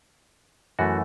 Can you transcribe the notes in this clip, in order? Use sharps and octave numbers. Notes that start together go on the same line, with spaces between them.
F#2 E3 A3 F#4